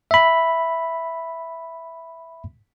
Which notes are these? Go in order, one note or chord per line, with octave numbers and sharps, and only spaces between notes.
E5 B5